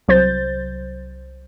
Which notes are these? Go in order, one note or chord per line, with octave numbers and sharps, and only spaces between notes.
C2 F#3 C5 G6 A6